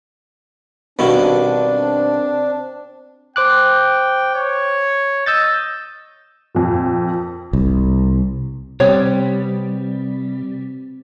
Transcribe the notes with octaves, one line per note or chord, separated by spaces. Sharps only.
G2 B2 D#3 B3 C4 D4 F#4
C5 G5 D6 F#6
C#5
D#5 E6 G6 A6
F2 A#2
C2
C3 G3 B3 C4 C#5